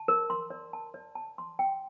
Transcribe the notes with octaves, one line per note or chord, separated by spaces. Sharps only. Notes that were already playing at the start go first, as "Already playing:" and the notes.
Already playing: A5
A#4
C6
D5
A5
D5
A5
C6
G5